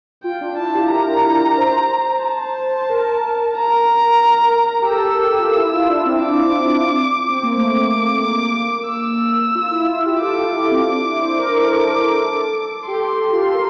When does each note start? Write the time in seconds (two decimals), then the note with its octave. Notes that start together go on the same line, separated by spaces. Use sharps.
0.24 F4 G5
0.41 D4
0.57 E4 A5
0.74 G4
0.90 A#4 A#5
1.24 A#4
1.57 C5
2.24 A5
2.80 C5
2.90 A#4
3.57 A#5
4.23 A#4
4.57 A#4
4.82 G4
4.90 A4 E6
5.06 A4
5.23 G4
5.39 F4
5.57 E4
5.73 F4
5.89 D4
6.06 C4
6.22 D6
7.29 C4
7.43 A#3
7.55 A3 D6
8.22 A#3
8.88 E6
9.55 F4
9.71 E4
9.89 F4
10.06 G4
10.21 A4 D6
10.39 F4
10.56 E4
10.71 C4
10.88 D4
11.05 E4
11.21 C5
11.39 A#4
11.55 A4
12.87 G4 C6
13.33 F4
13.40 G4
13.47 A4
13.54 A#4